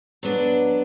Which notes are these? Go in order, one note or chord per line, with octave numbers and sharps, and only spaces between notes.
F#3 B3 D4